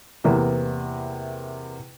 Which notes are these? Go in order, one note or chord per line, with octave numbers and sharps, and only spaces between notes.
E2 C3 A#3 B3 E4